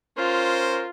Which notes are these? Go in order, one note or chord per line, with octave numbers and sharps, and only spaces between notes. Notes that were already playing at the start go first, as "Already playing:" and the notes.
C#4 F4 A#4 C5